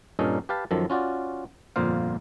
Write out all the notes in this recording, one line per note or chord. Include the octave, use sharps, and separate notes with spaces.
G2 A#2 C#4 D#4 A4 A#4
G4 B4 F5 A5
F#2 D#3 F3 A4
C#4 F4 F#4 D5
G1 F2 A#2 A#3 C5 F5